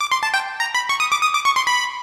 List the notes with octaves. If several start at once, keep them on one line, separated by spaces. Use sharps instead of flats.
D6
C6
A5
G5
A#5
B5
C#6
D#6
D6
D#6
D6
C#6
C6
B5